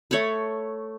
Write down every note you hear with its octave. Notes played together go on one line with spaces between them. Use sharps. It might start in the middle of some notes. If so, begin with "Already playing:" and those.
A3 C#5 A5 B5